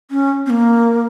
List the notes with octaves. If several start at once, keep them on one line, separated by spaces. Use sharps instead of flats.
C#4
C4
A#3